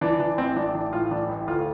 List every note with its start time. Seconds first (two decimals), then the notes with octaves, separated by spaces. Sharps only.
0.01 E3 D4
0.19 E3 D4
0.38 A1 C4
0.56 A1 D4
0.74 E3 D4
0.93 A2 F4
1.11 E3 D4
1.29 A1
1.48 D2 F4